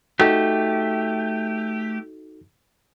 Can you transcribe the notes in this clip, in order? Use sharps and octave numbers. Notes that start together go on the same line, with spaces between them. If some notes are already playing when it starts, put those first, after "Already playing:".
A3 D#4 F#4 G4 A4